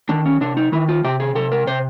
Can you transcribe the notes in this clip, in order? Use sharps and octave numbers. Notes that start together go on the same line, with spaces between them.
D#3 D4
C#4
C3 D4
D#4
D#3 E4
F4
C3 G4
G#4
C3 A4
A#4
C3 C5